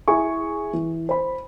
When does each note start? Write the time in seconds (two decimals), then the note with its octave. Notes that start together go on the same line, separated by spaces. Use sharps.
0.08 E4 G#4 G#5 C#6
0.73 E3
1.09 C5 B5